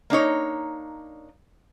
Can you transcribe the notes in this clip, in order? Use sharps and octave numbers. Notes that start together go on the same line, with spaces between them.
A#3 D4 D#4 C#5